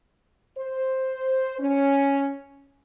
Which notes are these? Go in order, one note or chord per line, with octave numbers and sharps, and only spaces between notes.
C5
C#4